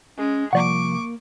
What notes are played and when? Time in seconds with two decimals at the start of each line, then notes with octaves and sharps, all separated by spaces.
0.18 G#3 C#4
0.53 C3 F3 G3 A#3 D5 F#5 C#6 D6